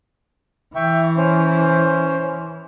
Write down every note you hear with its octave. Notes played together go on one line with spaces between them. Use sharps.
E3 E5 G5 C#6
C#4 C5